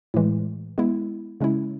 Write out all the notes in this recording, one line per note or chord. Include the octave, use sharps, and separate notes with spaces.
A2 E3 G#3
G#3 B3 E4
C#3 G#3 C#4 E4